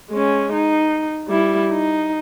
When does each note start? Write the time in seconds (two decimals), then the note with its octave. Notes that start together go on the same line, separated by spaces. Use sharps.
0.10 G#3 C#4
0.53 D#4
1.28 G3 E4
1.71 D#4